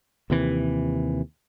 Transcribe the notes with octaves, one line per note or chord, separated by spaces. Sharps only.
D#2 C3 E3